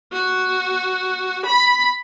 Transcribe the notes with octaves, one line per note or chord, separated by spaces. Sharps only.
F#4
B5